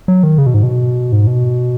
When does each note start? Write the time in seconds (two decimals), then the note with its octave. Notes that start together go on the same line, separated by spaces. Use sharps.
0.08 F#3
0.23 D#3
0.38 C#3
0.46 B2
0.54 G#2
0.63 B2
1.12 G#2
1.27 B2